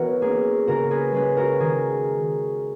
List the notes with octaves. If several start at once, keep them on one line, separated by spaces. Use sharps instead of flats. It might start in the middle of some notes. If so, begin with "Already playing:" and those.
Already playing: E3 B3 F#4 A#4 C#5
A#3 C#4 G#4
C#3 F#4 A#4
G#4 B4
G#3 C#4 G#4 B4
F#4 A#4
D#3 G#4